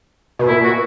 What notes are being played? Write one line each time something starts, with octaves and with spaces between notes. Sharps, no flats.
B2
A#2 E4
F#4